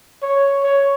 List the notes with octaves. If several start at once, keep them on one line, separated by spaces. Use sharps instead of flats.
C#5
C#5